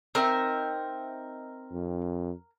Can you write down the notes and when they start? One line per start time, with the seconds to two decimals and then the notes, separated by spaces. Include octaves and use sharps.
0.15 C4 D#4 A#4 E5
1.73 F2